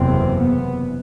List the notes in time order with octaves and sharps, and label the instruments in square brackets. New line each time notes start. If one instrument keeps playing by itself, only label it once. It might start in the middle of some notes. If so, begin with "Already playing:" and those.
Already playing: [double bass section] F#1 E2 C3 C4
B3